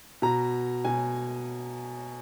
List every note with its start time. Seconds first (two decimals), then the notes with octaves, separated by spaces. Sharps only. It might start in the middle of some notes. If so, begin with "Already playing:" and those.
0.22 B2 A#5
0.84 B2 G#5